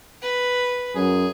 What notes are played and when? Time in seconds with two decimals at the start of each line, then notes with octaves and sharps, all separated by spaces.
0.22 B4
0.95 F#2 G#4